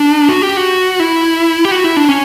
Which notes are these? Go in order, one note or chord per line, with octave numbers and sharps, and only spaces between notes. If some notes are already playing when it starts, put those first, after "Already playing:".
Already playing: D4
F#4
G4
F#4
E4
G4
F#4
E4
D4
C#4